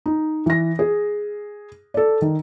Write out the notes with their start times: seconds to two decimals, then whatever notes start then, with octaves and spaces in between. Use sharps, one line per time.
0.06 D#4
0.46 E3 A#6
0.79 G#4
1.94 A4 D5
2.22 D#3